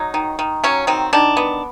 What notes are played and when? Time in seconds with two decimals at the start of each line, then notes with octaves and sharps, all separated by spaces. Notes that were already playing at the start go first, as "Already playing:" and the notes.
Already playing: F#3 D#4
0.14 D#3
0.39 D#3
0.64 F#3 C#4
0.87 D#3 C4
1.13 D#3 D4
1.37 B3